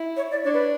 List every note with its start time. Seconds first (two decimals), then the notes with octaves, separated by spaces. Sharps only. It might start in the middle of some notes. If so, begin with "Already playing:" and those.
Already playing: E4
0.17 C#5
0.31 D5
0.45 D4 C#5
0.54 B4